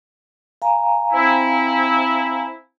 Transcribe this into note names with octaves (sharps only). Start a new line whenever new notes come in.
F5 G#5 A#5
C4 E4